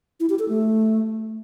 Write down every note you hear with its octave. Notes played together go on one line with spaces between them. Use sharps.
E4
G4
A4
A3